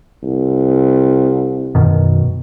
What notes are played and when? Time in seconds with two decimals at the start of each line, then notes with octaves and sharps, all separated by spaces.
0.23 C2
1.75 F#2 B2 D#3